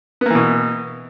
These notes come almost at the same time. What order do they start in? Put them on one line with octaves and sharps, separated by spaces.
B3 A#3 E3 B2